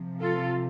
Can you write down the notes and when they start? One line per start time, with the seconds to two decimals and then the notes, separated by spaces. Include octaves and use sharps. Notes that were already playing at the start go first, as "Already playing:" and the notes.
Already playing: C3 F3
0.21 F4 A4